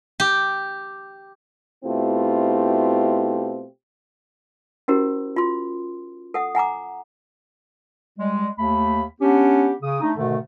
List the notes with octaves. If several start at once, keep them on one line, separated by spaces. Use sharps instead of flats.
G4
B2 A3 C4 E4 F4 G4
C#4 E4 F#4 G4 A#4 C5
F4 C6
A4 F#5 D#6
F#5 G#5 A#5 D6
G3 G#3
D#2 A3 B5
B3 C#4 D4 G4
C#3 D#6
A3 D4 D#4
G#2 B2 D3 D#3 A3